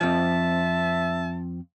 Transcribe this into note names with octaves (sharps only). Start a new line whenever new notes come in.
F2 F3 C4 E5 A5